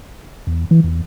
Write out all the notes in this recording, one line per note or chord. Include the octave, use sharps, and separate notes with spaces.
E2
E3
E2